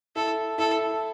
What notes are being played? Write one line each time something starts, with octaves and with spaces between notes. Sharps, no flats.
E4 A4
E4 A4